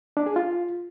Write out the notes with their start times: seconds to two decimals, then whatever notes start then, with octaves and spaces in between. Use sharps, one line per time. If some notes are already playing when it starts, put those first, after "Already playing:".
0.17 D4
0.26 G#4
0.36 F4